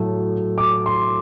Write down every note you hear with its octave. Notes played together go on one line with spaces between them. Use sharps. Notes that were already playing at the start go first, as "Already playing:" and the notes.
Already playing: A2 F#3 A3
D6
C6